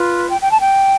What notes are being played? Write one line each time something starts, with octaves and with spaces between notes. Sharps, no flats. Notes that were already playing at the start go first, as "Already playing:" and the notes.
Already playing: F4 B4
G5
G5
A5
G5